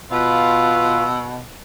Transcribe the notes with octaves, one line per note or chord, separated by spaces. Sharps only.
B2 F4 B4 E6